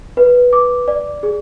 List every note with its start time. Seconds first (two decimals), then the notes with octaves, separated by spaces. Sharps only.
0.17 B4
0.53 D6
0.88 D5
1.23 G#4